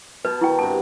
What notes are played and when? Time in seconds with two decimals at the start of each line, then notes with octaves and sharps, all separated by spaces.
0.25 B2 B4 A5
0.41 D#3 E4 F#4 G5
0.59 G2 C3 A5